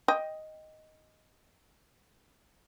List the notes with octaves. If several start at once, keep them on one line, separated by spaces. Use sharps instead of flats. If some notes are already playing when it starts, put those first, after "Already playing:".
D#5 G5